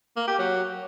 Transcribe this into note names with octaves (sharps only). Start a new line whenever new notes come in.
A#3
G4
F#3